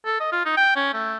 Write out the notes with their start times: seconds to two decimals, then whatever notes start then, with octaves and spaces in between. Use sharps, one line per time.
0.06 A4
0.20 D#5
0.32 F4
0.45 D#4
0.57 G5
0.76 C#4
0.94 A3